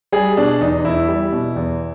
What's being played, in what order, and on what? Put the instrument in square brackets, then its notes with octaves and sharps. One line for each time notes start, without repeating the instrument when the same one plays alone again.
[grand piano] G3 G#4
B2 D4
E2 D#4
E2 E4
G3
B2
E2